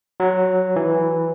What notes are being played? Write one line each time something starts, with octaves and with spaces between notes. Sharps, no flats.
F#3
E3